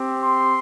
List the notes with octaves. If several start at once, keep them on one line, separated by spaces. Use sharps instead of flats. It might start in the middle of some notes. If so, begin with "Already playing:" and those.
Already playing: C4 G4
C6